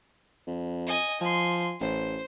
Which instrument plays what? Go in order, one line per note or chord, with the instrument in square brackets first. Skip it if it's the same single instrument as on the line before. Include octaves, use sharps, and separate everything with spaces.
[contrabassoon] F2
[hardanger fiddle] D#5 G#5
[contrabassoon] F3 [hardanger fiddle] G#5 C6
[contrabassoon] A1 [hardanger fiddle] C5